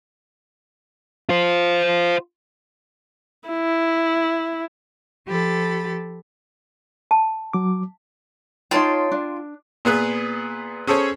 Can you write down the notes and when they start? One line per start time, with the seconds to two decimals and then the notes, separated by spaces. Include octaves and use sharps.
1.29 F4 C5
3.49 E4
5.28 F3 G4 A4 B5 A6
7.11 A5
7.53 F#3 D6
8.71 D#4 F4 C#5 G5 A5 C6
9.12 D4
9.85 A#2 B3 G#4 B4
10.87 C#4 G#4 A4 C5 C#5